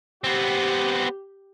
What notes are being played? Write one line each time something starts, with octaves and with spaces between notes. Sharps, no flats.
B3 C4 G4